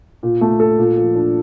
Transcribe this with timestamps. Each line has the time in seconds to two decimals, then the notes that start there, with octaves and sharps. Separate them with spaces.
0.23 A#2
0.41 A3
0.60 A4
0.79 A#2
0.97 F3
1.15 D4